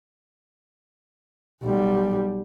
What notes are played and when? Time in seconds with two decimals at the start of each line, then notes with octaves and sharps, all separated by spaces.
1.63 B1 G3